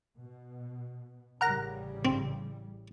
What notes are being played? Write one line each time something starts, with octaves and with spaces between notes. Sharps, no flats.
B2
A1 C#3 G3 A#4 F#5 A#5
C4